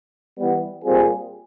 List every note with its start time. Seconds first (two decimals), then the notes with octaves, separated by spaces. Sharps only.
0.37 E3 G3 B3
0.83 A#2 G3 C4 F4 G#4